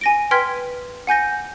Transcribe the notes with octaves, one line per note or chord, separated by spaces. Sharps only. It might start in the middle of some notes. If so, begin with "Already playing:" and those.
G#5 A#6 D7
B4 G5 C6 F6 G#6 B6
F#5 G#5 G6 A#6